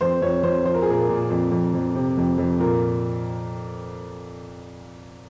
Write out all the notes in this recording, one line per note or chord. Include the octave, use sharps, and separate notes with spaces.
F2 C5
F2 C#5
F2 C5
F3 C5
A#4
G#4
A#2 A#4
A#2
F2
F2
F2
C3
F2
F2
A#2 A#4